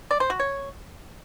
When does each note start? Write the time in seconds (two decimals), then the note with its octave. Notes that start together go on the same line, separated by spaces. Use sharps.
0.11 D5
0.20 C5
0.30 F#4
0.40 C#5